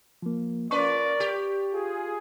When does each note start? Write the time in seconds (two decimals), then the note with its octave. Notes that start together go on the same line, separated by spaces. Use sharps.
0.22 F3 A#3
0.71 C#4 F4 A#4 B4 D5 C#6
1.20 G4
1.73 F4 G#4